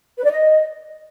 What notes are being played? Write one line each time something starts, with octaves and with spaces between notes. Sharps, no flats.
B4
D5
D#5